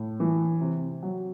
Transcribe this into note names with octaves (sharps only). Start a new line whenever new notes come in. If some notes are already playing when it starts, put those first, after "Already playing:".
Already playing: A2
E3
C3
F#3